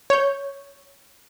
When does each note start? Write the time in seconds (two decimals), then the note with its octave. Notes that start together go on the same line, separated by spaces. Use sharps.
0.10 C#5 G6